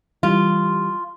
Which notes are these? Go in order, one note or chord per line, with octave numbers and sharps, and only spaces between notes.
E3 G3 F4